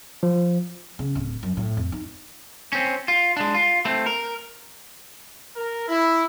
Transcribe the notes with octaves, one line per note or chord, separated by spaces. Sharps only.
F3
C#3
D1
F#2
A2
F2
D#4
C4 C#4
F4
G#3 D4
F4
A3 C4
A#4
A#4
E4